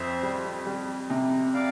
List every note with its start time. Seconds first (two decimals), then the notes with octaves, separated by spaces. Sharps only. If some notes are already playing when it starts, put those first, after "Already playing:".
Already playing: F2 C5 E5
0.23 G3
0.66 G3
1.10 C3
1.54 D5 F5